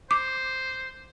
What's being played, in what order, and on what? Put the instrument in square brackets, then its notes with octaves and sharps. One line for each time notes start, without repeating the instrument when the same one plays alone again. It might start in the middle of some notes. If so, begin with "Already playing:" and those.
[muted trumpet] C5 [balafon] D6